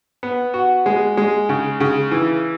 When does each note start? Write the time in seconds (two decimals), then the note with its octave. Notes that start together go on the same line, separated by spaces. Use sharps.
0.23 B3
0.54 F#4
0.86 G#3
1.17 G#3
1.49 C#3
1.80 C#3
2.11 E3